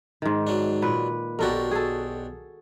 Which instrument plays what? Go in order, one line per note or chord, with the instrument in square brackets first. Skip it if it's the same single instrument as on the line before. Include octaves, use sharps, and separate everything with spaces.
[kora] G#2 D#3
[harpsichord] F#3 D4
[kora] A#2 B4
[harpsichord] B1 D4 G4 [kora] F#4 A4 A#4
[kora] G#4 A4